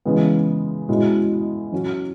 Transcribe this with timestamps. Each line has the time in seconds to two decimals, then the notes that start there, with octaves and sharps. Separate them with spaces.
0.05 C#3 E3 G#3 B3
0.89 B2 G#3 C#4 E4
1.72 F#3 C#4 F#4